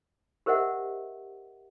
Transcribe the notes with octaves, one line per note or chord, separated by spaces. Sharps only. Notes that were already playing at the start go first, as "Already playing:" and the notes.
G4 A#4 C5 D#5 E5 F#5